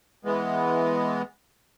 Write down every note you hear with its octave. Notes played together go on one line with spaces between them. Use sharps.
E3 G#3 B3